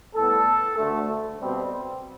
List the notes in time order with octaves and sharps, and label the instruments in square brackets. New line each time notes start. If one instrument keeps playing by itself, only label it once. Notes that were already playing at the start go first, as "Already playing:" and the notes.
[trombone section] A2 G3 B3 A4
D2 D3 A3
B2 G3 C4